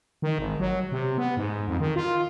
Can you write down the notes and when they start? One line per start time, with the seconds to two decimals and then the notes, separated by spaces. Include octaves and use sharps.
0.22 D#3
0.38 G#1
0.60 F#3
0.92 C3
1.18 B3
1.37 G#2
1.68 F2
1.80 D#3
1.96 F4